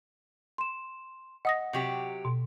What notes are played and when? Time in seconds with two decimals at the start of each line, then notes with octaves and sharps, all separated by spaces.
0.58 C6 E7
1.45 D#5 F#5 D#6 A#6
1.73 C3 F#3 G4
2.25 B2